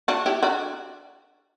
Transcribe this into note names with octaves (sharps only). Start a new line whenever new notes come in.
D4 F#4
E4 G4
D4 F#4